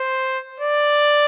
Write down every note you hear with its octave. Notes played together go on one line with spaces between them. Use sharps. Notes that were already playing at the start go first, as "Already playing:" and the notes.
Already playing: C5
D5